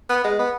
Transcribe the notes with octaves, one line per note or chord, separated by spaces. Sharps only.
B3
G#3
B3